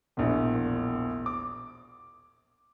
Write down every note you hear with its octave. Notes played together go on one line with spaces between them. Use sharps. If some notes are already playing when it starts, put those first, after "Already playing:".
E1 A#1 A2
D6